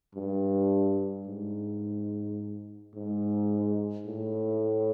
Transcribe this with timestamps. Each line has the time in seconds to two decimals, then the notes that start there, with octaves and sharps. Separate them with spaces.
0.15 G2
1.27 G#2
2.95 G#2
4.06 A2